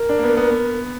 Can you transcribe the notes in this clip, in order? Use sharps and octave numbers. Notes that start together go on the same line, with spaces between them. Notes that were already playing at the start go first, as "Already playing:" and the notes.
Already playing: A#4
D4
A#3
B3
B3
B3